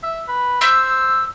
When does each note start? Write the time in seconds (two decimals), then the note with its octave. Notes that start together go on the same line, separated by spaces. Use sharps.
0.03 E5
0.28 B4
0.61 C5 E6